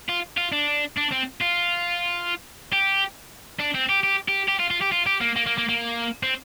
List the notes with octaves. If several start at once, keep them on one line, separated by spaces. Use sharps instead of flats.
F4
F4
D4
D4
C4
F4
G4
D4
C4
G4
G4
G4
G4
F4
F4
G4
F4
G4
A#3
A#3
A#3
A#3
A#3
C4